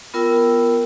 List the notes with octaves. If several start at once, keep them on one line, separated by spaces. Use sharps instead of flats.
B3 F4 A#4 G5 E6